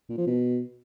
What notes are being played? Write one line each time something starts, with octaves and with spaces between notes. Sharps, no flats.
A#2
F3
B2